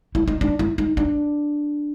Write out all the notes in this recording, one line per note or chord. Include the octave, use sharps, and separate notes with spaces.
E4
D#4
D4
E4
D#4
D4